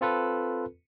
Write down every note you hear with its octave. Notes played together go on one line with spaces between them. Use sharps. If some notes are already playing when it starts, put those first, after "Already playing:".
C4 F4 A4 B4